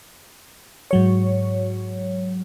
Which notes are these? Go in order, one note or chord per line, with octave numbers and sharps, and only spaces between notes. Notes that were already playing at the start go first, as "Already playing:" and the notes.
G#2 F#3 C#5